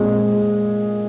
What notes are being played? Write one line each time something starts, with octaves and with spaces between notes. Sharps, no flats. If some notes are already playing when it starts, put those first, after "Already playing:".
Already playing: A#2 G#3 C4 G#4